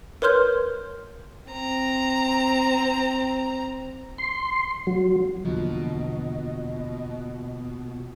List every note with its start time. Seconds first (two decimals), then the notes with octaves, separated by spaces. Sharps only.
0.22 A#4 B4 C#5 C6 F6 G6
1.51 C4 A#5
4.18 C6
4.87 F#3
5.45 E2 B2 D3 F3 A#3 F4 D#5